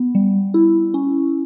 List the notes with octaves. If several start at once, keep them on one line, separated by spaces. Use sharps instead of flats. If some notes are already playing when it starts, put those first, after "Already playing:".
Already playing: B3
G3
E4
C#4